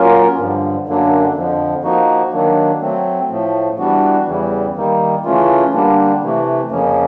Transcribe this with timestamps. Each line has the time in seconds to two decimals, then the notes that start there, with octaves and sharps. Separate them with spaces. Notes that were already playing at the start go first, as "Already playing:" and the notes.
Already playing: F#3 A#3 C#4 F4 A#4
0.37 G2 D3 F3
0.86 F#2 D3 F#3 A#3 D4
1.35 F2 D3 F3
1.84 F3 A#3 D#4 F#4
2.33 D#3 F#3 A#3 D4
2.81 F#3 A3 C4
3.30 A2 F3 A3
3.78 E3 G3 B3 D4 F#4
4.27 E2 C#3 E3 G3
4.76 D#3 G3 A#3 D#4
5.25 C#3 E3 A3 C#4 F4
5.74 D3 G3 A#3 D4
6.22 C3 E3 A3
6.71 F2 C#3 F3 A#3 C#4